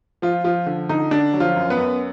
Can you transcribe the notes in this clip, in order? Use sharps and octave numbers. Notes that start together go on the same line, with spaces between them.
F3 F4
F3 F4
D3
D3 D#4
D3 D4
F#3
F3 F4
F#2
B3 B4
F#2